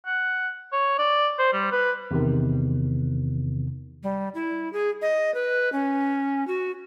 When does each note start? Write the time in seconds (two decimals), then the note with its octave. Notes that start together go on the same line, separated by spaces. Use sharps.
0.06 F#5
0.73 C#5
0.99 D5
1.39 C5
1.53 G3
1.72 B4
2.11 E2 C3 D#3
4.03 G3
4.35 E4
4.73 G#4
5.02 D#5
5.34 B4
5.73 C#4
6.48 F#4